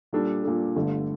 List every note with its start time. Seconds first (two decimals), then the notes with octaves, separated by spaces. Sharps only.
0.13 A#2 G3 D4 A4
0.44 A#2 G3 D4 A4
0.76 G1 G2 D3 A3